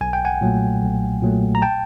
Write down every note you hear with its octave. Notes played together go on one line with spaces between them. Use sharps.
B1 G#5
G5
F#5 G#5
A#2 F#3 A3
B1
A#2 F#3 A3
A#5
G5 A5